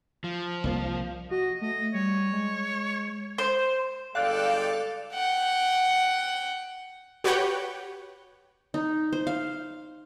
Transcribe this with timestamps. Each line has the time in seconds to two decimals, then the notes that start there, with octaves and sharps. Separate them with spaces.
0.24 F3
0.64 C2 G#3 A#3
1.31 F#4 D#5
1.61 A3 D#5
1.94 G3 C#5
2.32 G#3
3.38 C5
4.15 G1 G#3 A4 D5 F5 G5 F#6
5.13 F#5 G5
7.24 F#4 G4 B4 C#5 F#5 G5
8.74 D#4
9.12 C5
9.27 F5